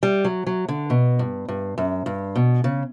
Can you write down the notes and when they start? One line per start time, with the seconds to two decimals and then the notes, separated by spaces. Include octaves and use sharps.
0.03 G3
0.24 F#3
0.47 F#3
0.68 D3
0.90 B2
1.19 G2
1.48 G2
1.78 F#2
2.06 G2
2.35 B2
2.64 C#3